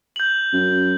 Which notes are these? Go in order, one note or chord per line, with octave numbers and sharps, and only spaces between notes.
G6 F#7
F#2